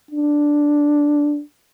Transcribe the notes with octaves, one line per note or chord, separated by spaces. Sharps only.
D4